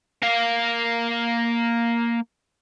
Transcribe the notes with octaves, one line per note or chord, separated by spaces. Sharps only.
A#3 F5